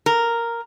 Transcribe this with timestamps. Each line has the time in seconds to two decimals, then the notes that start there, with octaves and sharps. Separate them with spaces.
0.06 A#4